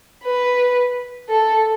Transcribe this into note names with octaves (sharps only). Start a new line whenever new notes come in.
B4
A4